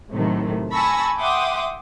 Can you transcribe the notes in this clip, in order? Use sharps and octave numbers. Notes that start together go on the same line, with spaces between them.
A2 C3 D#3 F#3 A3
G#5 A5 B5 C#6 E6 A#6
E5 F#5 G5 C6 D6 D#6